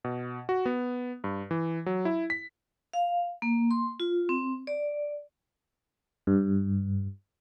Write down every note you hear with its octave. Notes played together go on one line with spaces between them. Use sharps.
B2
F#4
B3
G2
E3
F#3
E4
B6
F5
A#3
C6
F4
C4
D5
G2